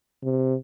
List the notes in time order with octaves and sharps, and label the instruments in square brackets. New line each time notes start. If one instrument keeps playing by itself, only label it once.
[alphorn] C3